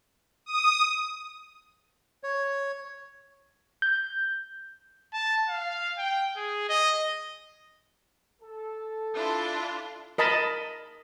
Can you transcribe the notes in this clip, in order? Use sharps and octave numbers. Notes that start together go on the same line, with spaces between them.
D#6
C#5
G6
A5
F5
G5
G#4
D#5
A4
D4 E4 F4
A#4 D#5 A5 B5